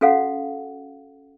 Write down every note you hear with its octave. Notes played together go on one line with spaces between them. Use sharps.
C#4 F#4 A4 F5 F#5